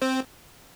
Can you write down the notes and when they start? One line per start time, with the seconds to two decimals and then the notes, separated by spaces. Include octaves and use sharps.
0.02 C4 C5